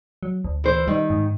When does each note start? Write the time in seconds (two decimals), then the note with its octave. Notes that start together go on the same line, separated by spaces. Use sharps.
0.23 F#3
0.44 D2
0.64 E3 C5
0.88 D#3 G3
1.10 G#2